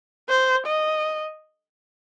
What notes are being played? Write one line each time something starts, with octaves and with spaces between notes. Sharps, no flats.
C5
D#5